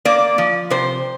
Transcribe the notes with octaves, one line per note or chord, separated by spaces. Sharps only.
A#3 D5
F3
C3 C5